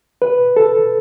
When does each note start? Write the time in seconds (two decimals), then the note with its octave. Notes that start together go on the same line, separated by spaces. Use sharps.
0.22 B4
0.57 A4